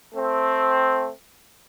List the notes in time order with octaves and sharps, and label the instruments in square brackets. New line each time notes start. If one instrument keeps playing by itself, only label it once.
[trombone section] A3 C4